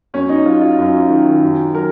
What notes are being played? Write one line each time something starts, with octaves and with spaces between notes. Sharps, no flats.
F#2 C#4
D#4
F#3 F4
F4
F#2
D#3
F#2
F#3 A#4